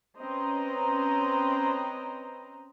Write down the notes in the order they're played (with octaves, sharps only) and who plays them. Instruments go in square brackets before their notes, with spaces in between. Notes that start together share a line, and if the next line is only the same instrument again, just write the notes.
[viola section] C4 C#4 B4 C5 D#5 A#5